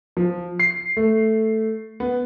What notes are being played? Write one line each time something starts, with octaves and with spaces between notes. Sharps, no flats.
F3
C7
A3
B3